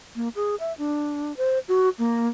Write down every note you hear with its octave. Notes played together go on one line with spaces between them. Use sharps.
A#3
G#4
E5
D4
C5
F#4
A#3